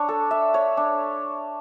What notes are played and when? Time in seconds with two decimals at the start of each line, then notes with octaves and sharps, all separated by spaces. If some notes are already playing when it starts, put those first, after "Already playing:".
Already playing: D4 C#5
0.09 A4
0.31 E5
0.54 C#5
0.77 D4